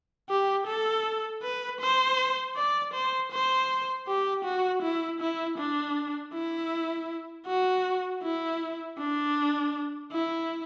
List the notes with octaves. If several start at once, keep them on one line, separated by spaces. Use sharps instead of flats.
G4
A4
B4
C5
D5
C5
C5
G4
F#4
E4
E4
D4
E4
F#4
E4
D4
E4